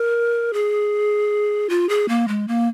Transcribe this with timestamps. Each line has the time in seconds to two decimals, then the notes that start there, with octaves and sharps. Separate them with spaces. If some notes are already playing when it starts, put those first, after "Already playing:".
Already playing: A#4
0.53 G#4
1.70 F4
1.89 G#4
2.09 A#3
2.28 G#3
2.48 A#3